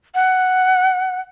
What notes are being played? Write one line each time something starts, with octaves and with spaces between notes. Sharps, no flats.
F#5